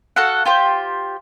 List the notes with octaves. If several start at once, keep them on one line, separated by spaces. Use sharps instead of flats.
F#4 A4 F5 F#5
F4 G4 C5